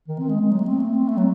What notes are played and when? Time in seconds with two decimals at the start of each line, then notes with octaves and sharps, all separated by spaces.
0.08 D#3
0.19 C4
0.29 G#3
0.41 G#3
0.52 F#3
0.59 A3
0.66 C4
0.80 A3
0.94 C4
1.08 A3
1.17 F#3